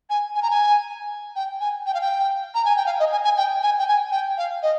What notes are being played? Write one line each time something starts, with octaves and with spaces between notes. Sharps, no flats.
G#5
G#5
A#5
G#5
G5
G#5
G5
F5
G5
A#5
G#5
G5
F5
D#5
G#5
G#5
G5
G#5
G5
G#5
G5
F5
D#5